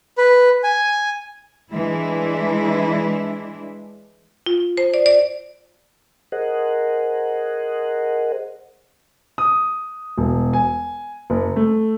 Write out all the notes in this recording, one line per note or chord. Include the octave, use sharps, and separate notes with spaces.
B4
G#5
E3 G#3 D4 E4
F4
C5
D5
D5
G#4 A#4 C5 D#5 F#5
D#6
E1
G#5
F#1
A3